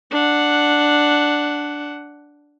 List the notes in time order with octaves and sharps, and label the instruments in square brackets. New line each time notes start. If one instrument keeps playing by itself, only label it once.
[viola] D4 F#5